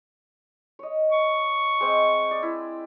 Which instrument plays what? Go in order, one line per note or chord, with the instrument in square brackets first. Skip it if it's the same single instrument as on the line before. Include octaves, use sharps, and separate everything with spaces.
[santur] C#5 D#5
[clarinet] C#6
[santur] G#3 C4
D5
E4